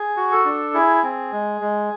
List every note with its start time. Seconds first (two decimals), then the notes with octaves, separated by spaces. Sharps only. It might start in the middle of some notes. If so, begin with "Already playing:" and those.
Already playing: G#4
0.17 F#4
0.32 A4
0.45 D4
0.74 E4 G#4
1.03 C4
1.32 G#3
1.61 G#3